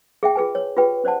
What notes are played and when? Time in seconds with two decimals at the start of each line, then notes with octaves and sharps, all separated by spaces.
0.23 G#4 E5 G5
0.35 F4 G#4 B4 G#5
0.55 C#5
0.77 F4 G4 G#4 B4 G5
1.04 C#4 C5 D5 F#5 A5